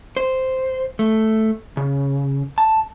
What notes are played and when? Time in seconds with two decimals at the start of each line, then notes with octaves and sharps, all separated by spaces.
0.17 C5
0.99 A3
1.77 C#3
2.58 A5